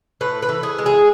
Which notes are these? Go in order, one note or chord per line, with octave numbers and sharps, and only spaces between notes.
A2 B4
B4
E3
G#4
G#3
G#4